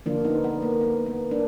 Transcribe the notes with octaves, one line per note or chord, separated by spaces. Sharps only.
D3 F3 A#3 D4 F4
B3 D#4
B3
A#3
B3
B3
A#3 D4